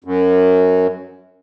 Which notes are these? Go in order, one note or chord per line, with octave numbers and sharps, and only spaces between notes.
F#2